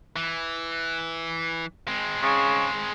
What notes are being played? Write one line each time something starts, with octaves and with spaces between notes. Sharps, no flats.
E3
G#3 C4
C#3